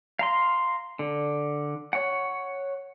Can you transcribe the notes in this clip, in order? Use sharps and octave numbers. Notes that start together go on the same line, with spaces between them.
F5 A#5 C6
D3
C#5 F#5